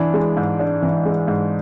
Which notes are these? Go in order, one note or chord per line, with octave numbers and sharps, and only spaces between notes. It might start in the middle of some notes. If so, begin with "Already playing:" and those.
Already playing: E3 D4
G#3
G#2
D4
E3
G#3
G#2